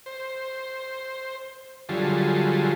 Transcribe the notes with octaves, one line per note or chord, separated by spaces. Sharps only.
C5
D3 F#3 G3 F4 G#4 A4